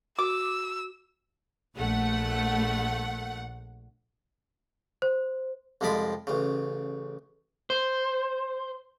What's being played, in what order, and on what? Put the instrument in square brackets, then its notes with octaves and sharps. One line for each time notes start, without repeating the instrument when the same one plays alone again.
[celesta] F#4 [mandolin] D6 [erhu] E6
[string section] A#1 A3 F#5
[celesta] C5
[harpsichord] C2 F2 F3 G#3 D5 B5
A1 C#3
[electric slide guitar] C5